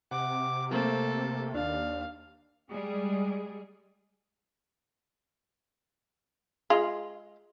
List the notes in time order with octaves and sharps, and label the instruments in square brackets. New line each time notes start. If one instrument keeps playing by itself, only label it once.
[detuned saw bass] C3 [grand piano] F#5 [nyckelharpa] D6
[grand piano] A3 A#3 C5 [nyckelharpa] A4
[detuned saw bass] D#2 [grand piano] D4 [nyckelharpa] F5
[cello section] G3 G#3 G#4
[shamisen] G#3 F4